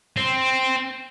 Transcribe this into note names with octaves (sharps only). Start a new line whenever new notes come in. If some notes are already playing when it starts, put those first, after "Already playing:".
C4